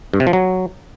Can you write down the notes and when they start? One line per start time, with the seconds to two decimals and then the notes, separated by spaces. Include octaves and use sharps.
0.14 G2
0.20 C3
0.27 F3
0.33 F#3